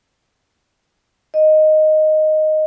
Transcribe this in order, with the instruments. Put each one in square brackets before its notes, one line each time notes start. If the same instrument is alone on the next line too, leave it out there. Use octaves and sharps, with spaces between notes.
[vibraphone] D#5